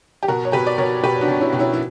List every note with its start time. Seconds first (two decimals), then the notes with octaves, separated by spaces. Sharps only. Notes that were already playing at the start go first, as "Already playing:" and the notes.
0.23 G4
0.28 B2 F#4 A#4
0.45 C#5
0.52 B2 G4 B4
0.67 D5
0.78 B2 A#4 C#5
1.03 B2 G4 B4
1.21 D4 F#4
1.28 B2
1.40 C#4 E4
1.53 B2
1.59 C#4 E4
1.74 E4